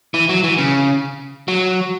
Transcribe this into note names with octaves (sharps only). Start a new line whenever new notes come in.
E3
F#3
E3
C#3
F#3